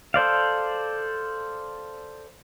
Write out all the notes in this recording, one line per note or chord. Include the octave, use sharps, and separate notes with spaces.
A4 C5 D5 F5